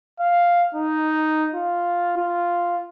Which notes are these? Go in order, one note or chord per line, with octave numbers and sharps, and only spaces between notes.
F5
D#4
F4
F4